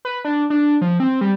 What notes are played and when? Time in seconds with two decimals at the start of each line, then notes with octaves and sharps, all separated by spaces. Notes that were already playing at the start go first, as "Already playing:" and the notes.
0.05 B4
0.25 D4
0.50 D4
0.81 F3
1.00 C4
1.21 G3